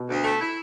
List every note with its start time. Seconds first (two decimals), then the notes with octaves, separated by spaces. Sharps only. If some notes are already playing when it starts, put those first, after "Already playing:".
Already playing: B2
0.08 D2
0.24 A3
0.40 E4